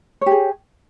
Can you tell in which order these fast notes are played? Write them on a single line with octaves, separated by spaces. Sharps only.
C#5 G4 G#4